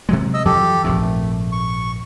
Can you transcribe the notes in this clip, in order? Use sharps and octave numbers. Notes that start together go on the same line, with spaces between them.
C3 F#3 G#3
D#5 E6
F2 E3 F#3 G4 A4
A#1 F2 G#2 A3
C#6